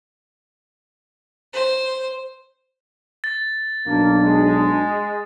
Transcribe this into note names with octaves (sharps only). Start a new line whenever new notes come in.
C5
A6
B1 A#3 D4
G#3